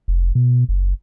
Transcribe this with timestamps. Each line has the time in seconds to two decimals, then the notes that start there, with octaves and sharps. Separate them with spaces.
0.08 F1
0.35 B2
0.69 F#1